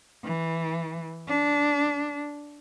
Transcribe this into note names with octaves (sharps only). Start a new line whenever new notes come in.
E3
D4